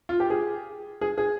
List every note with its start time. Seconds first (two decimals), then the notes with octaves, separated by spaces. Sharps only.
0.09 F4
0.20 G4
0.30 G#4
1.01 G#4
1.18 G#4